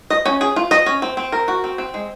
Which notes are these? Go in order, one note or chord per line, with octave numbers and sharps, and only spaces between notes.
D#5
C#4
G#4
F4
D#5
C#4
C4
C4
A#4
F#4
C4
C4
G#3